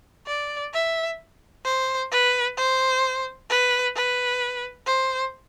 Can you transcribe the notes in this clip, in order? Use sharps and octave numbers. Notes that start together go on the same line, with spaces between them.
D5
E5
C5
B4
C5
B4
B4
C5